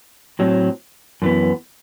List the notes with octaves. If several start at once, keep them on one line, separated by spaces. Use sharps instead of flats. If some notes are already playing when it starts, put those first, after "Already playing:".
A2 F#3 C4
F#2 E3 B3